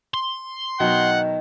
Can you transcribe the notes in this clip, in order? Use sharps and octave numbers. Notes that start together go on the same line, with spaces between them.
C6
B2 D#3 F#3 F#5